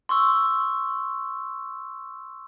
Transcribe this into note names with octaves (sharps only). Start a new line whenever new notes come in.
C6 C#6 E6